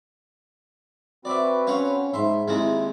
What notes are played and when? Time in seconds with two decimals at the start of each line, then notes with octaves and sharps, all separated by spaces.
1.25 C4 F#4 B4 D5 E5
1.67 C#4 C#5 F5 F#5
2.14 G#2 E5 B5 C6
2.48 D#2 G#3 C4 E4